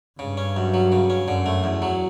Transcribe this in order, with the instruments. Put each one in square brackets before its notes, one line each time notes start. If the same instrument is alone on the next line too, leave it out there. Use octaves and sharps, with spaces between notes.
[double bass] G2 [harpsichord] C#3
[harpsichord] C#4
F#2
F#3
C#3
C#4
[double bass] F#2 [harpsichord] D3
[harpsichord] A3
E2
F#3